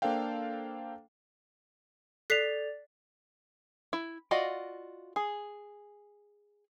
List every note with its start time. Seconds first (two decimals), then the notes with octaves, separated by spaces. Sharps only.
0.02 A#3 D4 A4 C5 F5 G5
2.30 A4 D5 F#6 A6 B6 C7 F7
3.93 E4
4.31 F4 F#4 D5 D#5
5.16 G#4